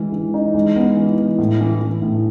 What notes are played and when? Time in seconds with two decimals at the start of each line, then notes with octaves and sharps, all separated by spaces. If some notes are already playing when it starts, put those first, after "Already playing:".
Already playing: E3 G#3
0.12 E3
0.34 D#4
0.54 G#3
0.76 B3
0.97 E3
1.18 E3
1.39 A2
1.61 E3
1.81 E3
2.02 A2